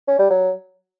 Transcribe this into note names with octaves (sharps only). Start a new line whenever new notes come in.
C#4
G3
F#3